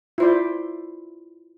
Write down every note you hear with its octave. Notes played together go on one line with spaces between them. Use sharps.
E4 F4 C5 D5